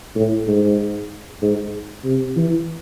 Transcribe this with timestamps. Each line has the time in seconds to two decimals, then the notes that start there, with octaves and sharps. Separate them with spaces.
0.16 A2
0.48 G#2
1.42 G#2
2.05 C3
2.36 E3